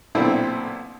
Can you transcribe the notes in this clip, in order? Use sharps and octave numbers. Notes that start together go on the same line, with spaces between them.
B1 A#2 D3 C4 E4